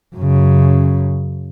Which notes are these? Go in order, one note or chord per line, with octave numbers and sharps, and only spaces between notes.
F#2 C#3